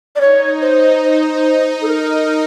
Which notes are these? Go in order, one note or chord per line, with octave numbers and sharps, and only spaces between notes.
D5
D#4 C#5
C5
C5
A4
A#4